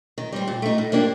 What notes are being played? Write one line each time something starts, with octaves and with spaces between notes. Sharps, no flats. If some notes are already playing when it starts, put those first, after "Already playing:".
D#3
G3 C4
A#2
A3 D#4
A2
F3 A#3 D4 G4